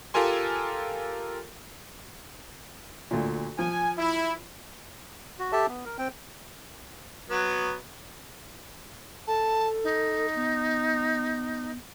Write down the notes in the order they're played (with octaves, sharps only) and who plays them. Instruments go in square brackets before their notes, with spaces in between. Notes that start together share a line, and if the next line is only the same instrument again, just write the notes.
[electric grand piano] F4 G4 A4 A#4 G#5 C6
[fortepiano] D2 A#2
[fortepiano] F3 [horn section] G#5
[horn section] E4
[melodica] F#4
G4 A4 E5 A5
B3
A#4
C4 G5
[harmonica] F#3 B3
[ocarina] A4 [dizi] A5
[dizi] D#4
[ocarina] B3